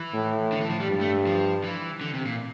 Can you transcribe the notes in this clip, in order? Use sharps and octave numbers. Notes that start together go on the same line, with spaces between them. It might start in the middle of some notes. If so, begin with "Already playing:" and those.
Already playing: E3
A2
D3
E3
F3
G3
G2
A3
F3
E3
D3
C3
A#2